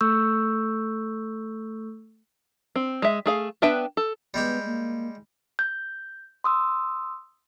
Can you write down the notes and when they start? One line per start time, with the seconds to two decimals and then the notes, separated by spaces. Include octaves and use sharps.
0.01 A3 A4 C#6 E6 G6
2.76 C4
3.02 G#3 E5
3.26 A3 G#4 F5
3.62 B3 D4 B4 E5 G5
3.97 A4
4.34 G3 G#3 B3 G4
4.65 A#3
5.59 G6
6.44 C6 D#6 E6